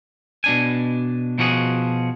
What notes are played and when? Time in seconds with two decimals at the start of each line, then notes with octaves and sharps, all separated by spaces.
0.44 B2 D4 G#5
1.38 B2 F3 F#4 G#4